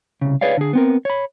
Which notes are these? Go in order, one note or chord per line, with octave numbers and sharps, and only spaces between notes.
C2 C#3
G#4 B4 C#5 D5 F5
D3 G#4
B3 C4 A#4
C#5 B5